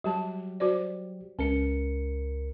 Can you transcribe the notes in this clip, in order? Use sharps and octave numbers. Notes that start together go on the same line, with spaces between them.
F#3 G3 G4 A5
F#4 C5 D5
C#2 C#4 A#4 C#7